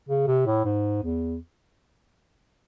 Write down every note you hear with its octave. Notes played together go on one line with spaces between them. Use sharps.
C#3
C3
A2
G#2
E2